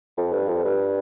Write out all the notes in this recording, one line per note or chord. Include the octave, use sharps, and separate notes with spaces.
F2
G2
F2
G2